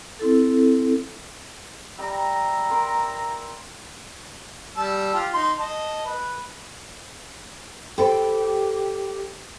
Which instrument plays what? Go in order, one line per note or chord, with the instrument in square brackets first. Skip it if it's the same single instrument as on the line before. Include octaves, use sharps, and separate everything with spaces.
[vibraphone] C4 E4 A4
[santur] G3 G4 G5 [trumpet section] E5 A#5
[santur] A#4 B4 C6
[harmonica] G3 A5 E6
F4 G4
D#4 C6
D#5 A5
B4
[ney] G4 [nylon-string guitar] A4 C5 [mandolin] G5 B5